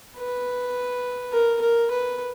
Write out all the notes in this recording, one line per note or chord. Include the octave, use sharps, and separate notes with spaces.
B4
A#4
A#4
B4